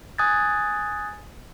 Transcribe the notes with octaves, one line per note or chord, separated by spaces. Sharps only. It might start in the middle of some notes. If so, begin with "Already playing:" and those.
G#5 D#6 F#6 G#6 A6